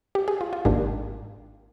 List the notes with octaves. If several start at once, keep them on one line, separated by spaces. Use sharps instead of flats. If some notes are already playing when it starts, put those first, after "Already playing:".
G4
G#4
F4
F4
G#1 G#2 D#3 A#3 D4 G4